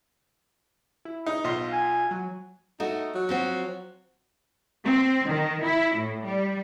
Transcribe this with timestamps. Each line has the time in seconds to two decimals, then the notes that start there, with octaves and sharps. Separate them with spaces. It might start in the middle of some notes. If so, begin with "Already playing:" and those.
1.05 E4
1.26 D#4
1.44 B1 F4 D#5 C6
1.73 G#5
2.11 F#3
2.80 A3 D#4 F#4
3.15 F#3
3.29 F3 C4 F#4
4.84 C4
5.28 D#3
5.64 E4
5.95 A2
6.25 G3